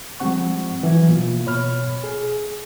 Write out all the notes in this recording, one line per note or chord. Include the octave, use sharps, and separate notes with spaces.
F3 G3 G#3 C4 F#5 C#6
E3 F#3 E4
B2 A#3 F4
B2 C#5 B5 F6
G#4